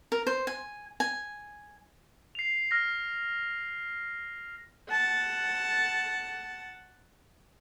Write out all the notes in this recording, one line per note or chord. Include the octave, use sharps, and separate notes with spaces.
A#4
C5
G#5
G#5
C7 F7
F6 A#6
F#5 A5